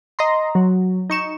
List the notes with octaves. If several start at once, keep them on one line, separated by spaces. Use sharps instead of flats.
D#5 A#5 C6
F#3
D#4 C#6 E7